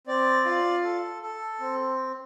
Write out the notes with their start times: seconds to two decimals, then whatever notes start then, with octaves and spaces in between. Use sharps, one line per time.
0.07 C4 D5
0.45 F4
0.84 A4
1.22 A4
1.60 C4